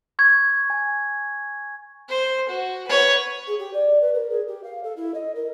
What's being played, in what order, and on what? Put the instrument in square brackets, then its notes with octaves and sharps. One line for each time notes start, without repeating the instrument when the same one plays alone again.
[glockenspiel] C#6 G#6
G#5
[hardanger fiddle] C5
F#4
B4 C#5
[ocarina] G#4
G4
D5
B4
A#4
G#4
G4
F5
A4
E4
D#5
A#4